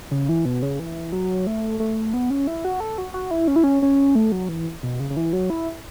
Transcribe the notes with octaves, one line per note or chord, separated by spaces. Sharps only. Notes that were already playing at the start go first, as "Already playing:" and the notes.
C#3
E3
B2
C#3
E3
F#3
A3
A3
B3
C#4
E4
F#4
A4
F#4
F#4
E4
C#4
E4
C#4
C#4
A3
F#3
E3
B2
C#3
C#3
E3
F#3
E4